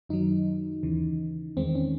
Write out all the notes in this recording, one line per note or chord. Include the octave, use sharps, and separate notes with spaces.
F#2 D#3 F#3 D#4
D#2 C#3 E3
E2 D#3 G#3 C4
C#4